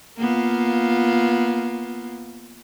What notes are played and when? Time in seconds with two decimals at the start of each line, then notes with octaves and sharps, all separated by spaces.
0.18 A#3 B3 F4